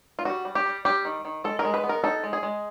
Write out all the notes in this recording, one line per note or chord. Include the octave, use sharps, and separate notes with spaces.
F4
G3 F#4
G3
G4
G3
G3 G4
D#3
D#3
G#3 A4
A#4
G#3
B4
B3
A#4
D#4 A4
G#3
G#4
G#3